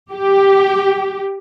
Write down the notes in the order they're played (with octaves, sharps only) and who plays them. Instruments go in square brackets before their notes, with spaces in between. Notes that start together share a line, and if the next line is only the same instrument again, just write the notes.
[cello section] G4